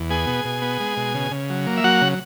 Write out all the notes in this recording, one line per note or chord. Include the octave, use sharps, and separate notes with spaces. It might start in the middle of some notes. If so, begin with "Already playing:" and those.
Already playing: E2
B3 G#4 G#5
B2
B2
B3
G#3
B2
C#3
C#3
F#3
A#3
E5
F#3 F#4 F#5
C#3